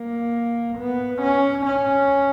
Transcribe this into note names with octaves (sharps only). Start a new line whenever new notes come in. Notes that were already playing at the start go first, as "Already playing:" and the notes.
Already playing: A#3
B3
C#4
C#4